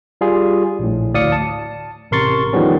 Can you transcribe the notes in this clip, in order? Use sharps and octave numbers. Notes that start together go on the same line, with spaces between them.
G3 F4 G#4
A#1 A2
D2 A2 D5 F5 D#6 C#7
A5
A1 C3 A#4 C6 C#6 A6
E2 D#3 F3 G3 B3 C#4